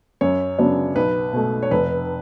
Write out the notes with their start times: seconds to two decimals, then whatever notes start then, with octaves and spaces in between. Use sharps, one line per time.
0.21 F#2 C#5
0.58 C#3 F#3 B3 D4
0.96 B1 B4
1.33 B2 A3
1.63 C#5
1.71 F1 B4